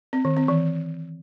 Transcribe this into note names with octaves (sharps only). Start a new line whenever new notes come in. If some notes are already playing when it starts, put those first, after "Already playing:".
C4
D#3
C4
E3